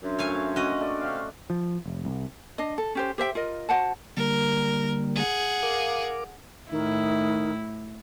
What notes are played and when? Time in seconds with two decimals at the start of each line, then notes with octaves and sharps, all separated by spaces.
0.03 F#2 D4 E5 C6
0.18 A3 C5 C#5 F5 G#5
0.56 A#3 C#4 F#4 D#5
0.80 A3 D5
1.01 C3 F5
1.50 F3
1.86 F1
2.05 C2
2.58 D4 D#5
2.78 A4
2.95 C#4 G4 C5
3.18 G4 C5 E5 G5
3.35 F4 A#4 D#5
3.69 F#4 C5 F#5 A5
4.17 D3 G3 A#3 A#4
5.16 G#4 F#5
5.63 A#4 F5 D6
6.72 A2 D#3 E4